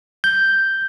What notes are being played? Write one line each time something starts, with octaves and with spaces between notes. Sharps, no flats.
G6